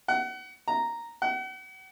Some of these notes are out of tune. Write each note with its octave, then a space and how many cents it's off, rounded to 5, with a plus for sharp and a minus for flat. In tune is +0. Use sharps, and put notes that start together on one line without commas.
F#5 +30
A#5 -5
F#5 +40